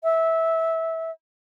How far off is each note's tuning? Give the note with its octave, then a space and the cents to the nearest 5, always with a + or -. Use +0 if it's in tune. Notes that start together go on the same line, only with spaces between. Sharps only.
E5 -15